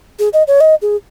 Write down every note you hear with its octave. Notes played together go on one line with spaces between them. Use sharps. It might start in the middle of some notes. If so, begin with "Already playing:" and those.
G#4
D#5
C#5
D#5
G#4